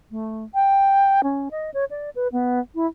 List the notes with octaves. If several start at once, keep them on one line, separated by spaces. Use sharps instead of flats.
A3
G5
C#4
D#5
C#5
D5
B4
B3
E4